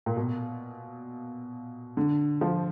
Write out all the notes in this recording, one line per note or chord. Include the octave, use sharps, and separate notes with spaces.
A#2
B2
D3
F3